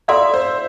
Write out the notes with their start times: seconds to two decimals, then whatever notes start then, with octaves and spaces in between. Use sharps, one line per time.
0.08 F4 A4 D5 E5 F5 C6
0.34 C5